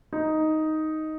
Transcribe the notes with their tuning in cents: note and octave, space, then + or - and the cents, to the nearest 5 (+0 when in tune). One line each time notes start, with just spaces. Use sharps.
D#4 +5